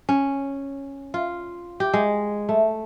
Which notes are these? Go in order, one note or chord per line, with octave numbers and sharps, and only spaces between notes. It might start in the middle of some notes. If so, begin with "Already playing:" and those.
C#4
F4
G4
G#3
A3